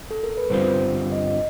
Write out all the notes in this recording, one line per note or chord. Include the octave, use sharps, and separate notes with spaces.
A4
A#4
B4
G2 D3 G3 C4 F4 C5
D#5
D#5